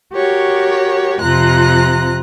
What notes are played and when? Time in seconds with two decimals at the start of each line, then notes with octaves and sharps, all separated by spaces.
0.13 F#4 G4 A#4 C#5
1.22 F2 C3 F4 A#5 F#6